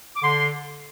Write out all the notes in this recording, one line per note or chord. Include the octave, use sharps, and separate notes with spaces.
D6
D3 C6